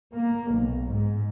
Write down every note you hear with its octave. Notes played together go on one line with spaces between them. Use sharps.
A#3
B1
G#2